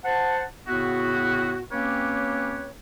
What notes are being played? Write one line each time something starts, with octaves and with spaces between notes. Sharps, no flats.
C5 F#5 A5
A2 C#3 B3 E4 F#4
A#3 C4 C#4 G4 B4 C#5